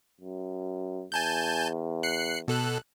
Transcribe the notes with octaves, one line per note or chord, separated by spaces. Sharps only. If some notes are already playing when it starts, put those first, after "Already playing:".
F#2
E2 G#5 A5 G6
F#6 C7 C#7
B2 A4 F#6